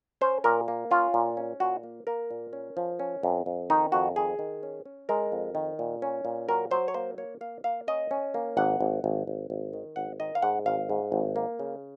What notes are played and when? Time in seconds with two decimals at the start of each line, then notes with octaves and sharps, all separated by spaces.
0.21 C#4 C5
0.44 A#2 A#4
0.68 A#3
0.91 C#4 F4
1.14 A#2
1.37 C#4
1.60 A#2 F#4
1.83 A#3
2.07 A#3 A#4
2.31 A#2
2.53 C#4
2.77 F3
2.99 C#4
3.23 F2
3.46 F2
3.70 D#3 D#4
3.92 F2 F#4
4.16 D#3 G#4
4.39 D#3
4.63 C#4
4.85 C#4
5.09 G#3 A#4
5.32 F2
5.55 D#3
5.79 A#2
6.02 C#4
6.25 A#2
6.48 F#3 A#4
6.71 F#3 C5
6.88 C#5
6.94 A#3 C5
7.18 A#3 C#5
7.41 A#3 F5
7.64 A#3 F5
7.87 C#4 D#5
8.11 C#4
8.34 A#3
8.57 G#1 F#5
8.81 G#1
9.04 G#1
9.27 G#1
9.50 G#1
9.73 D#3
9.96 G#1 F#5
10.20 D#3 D#5
10.35 F5
10.42 G#2 F#5
10.66 G#1 F5
10.90 G#2
11.12 G#1
11.36 A#3
11.60 C#3